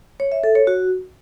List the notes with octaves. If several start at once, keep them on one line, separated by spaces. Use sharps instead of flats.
C#5
E5
A4
C#5
F#4